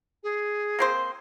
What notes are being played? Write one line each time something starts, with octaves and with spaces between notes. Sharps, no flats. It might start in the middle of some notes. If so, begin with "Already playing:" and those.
G#4
A#3 C4 C5